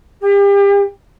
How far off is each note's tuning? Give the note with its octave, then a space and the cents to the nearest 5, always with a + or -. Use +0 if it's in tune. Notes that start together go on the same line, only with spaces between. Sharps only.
G4 +35